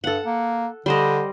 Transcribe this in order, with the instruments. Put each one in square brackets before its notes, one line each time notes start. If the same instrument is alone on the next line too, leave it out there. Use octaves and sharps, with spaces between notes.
[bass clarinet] G2 [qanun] A4 F#5
[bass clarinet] A#3
[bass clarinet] D3 [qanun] G3 C5 D#5